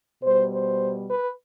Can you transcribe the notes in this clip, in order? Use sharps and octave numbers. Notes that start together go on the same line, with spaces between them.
B2 G3 C5
C5
B4